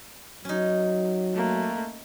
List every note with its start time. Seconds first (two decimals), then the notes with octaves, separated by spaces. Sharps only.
0.45 F#3 C#4 D#4
1.33 A3 A#3